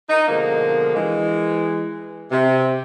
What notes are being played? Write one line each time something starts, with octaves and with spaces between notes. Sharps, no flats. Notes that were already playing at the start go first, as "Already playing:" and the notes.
D#4
B2 D3 F3 G#3 A#3
E3 G#3
C3